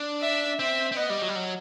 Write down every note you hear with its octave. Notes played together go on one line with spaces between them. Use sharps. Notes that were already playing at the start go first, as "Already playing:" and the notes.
Already playing: D4
E5
C4 E5
C4
B3 D#5
G3
F#3
G3
F#3